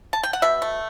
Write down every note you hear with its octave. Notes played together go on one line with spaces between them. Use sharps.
A5
G5
F#5
B2 E5
A3